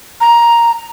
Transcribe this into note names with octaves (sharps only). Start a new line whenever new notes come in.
A#5